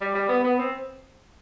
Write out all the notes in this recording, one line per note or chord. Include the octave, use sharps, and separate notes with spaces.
G3
G3
B3
B3
C4